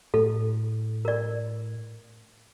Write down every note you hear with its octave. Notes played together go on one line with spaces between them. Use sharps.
A2 A4
A#4 D5